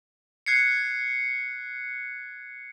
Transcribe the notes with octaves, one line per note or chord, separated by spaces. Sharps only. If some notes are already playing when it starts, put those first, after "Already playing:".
F#6 G#6 C7 C#7